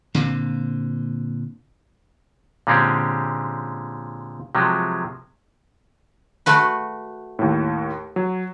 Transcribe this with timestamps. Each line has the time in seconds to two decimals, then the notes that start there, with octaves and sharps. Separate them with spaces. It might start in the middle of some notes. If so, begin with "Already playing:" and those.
0.14 A#2 D3 C4
2.67 A#2 D3 G#3 C4 C#4 G4
4.55 C3 F3 F#3 G#3
6.46 A3 F#4 B4
7.39 D#2 A2
8.16 F#3